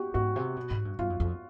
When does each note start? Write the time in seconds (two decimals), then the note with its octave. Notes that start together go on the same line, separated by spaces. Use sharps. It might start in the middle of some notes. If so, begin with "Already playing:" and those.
Already playing: F#4 G4
0.14 G#2 F#4
0.36 C3
0.56 B2
0.71 G#2
0.85 G2
0.99 G2 F4
1.10 F#2
1.20 F2